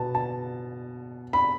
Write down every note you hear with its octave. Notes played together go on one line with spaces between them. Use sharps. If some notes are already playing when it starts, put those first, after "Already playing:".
Already playing: B2 B3 A5
A5
B5